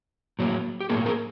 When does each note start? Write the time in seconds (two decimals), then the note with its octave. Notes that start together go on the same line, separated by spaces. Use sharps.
0.39 A2 F#3 A#3
0.80 G4
0.90 A2 F#3 A#3 F#4 G#4
1.06 G#4 A#4